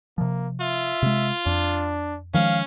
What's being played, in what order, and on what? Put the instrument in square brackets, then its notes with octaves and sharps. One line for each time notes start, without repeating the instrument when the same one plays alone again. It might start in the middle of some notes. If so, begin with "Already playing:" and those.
[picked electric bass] C3 F3 [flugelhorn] A#3
[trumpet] F4 [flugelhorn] E5
[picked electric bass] C3 G#3
[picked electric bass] F2 [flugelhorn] D4
[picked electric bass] D#3 F3 G#3 [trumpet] C#4 [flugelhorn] F5